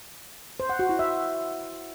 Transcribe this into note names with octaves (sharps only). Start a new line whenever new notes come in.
C5
F#5
F#4
E4
E5